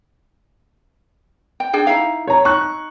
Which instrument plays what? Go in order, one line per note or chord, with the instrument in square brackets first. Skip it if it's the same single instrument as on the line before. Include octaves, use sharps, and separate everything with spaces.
[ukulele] G5
D4 G#4 G5
D#4 E4 F5
[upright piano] C#5 A#5
[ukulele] D#4 [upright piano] C#6 F#6